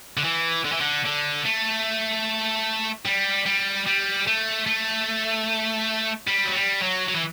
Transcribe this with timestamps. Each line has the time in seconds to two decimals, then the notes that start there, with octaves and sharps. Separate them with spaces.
0.17 D3
0.24 E3
0.65 D3
0.72 E3
0.81 D3
1.05 D3
1.45 A3
3.06 G3
3.46 G3
3.87 G3
4.27 A3
4.67 A3
6.28 G3
6.45 F#3
6.55 G3
6.81 F#3
7.08 F#3
7.15 E3